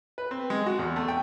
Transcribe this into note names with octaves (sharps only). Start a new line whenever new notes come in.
B4
C4
G#3
F#4
E2
A3
G5